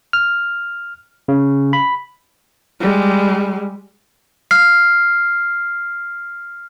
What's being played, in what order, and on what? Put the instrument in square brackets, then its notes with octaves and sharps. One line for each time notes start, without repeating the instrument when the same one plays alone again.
[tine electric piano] F6
C#3
B5
[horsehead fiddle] G3 G#3
[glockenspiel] F6 C7